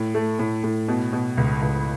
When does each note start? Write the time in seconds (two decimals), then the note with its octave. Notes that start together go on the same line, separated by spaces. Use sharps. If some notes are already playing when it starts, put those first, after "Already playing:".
Already playing: A2
0.15 A3
0.39 A2
0.64 A2
0.88 B2
1.13 B2
1.37 C#2
1.62 C#2